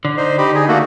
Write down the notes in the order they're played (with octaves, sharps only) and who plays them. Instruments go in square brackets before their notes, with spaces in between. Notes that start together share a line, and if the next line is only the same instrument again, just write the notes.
[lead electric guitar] D3
[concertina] D#4 C5
D#4 G4 B5
D#4 G#4
A3 A#3 F#4